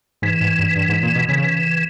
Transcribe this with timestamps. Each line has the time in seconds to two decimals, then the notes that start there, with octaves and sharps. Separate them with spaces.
0.22 G#2 E3
0.41 G#2
0.59 G2
0.76 G2
0.89 G#2
1.03 A#2
1.16 B2
1.29 C#3 E3